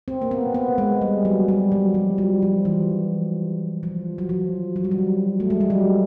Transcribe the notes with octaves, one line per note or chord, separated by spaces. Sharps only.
C4
A#3
B3
B3
G#3
G3
F#3
G3
F#3
F3
G3
F3
E3
F3
F#3
F3
F#3
G3
F#3
A3
G#3
G3
F#3